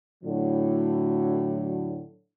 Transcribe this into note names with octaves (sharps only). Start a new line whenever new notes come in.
A2 D3 F#3